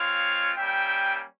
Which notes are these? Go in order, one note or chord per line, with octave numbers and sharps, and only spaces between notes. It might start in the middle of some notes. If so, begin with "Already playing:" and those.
Already playing: G#3 C4 F4 C#5 F5
G3 A#3 C#4 E5 G5